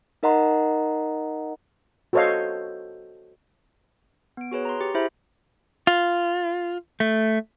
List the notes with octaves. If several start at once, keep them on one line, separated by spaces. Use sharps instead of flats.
D#4 A#4 D#5 F#5 A#5 C6
F#4 A4 C5 C#5 D#5 F5
B3 D7
F#4 G#4 B4 C#5
A#5 C6
G4
E4 G4 G#4 C5 E5 B5
F4
A3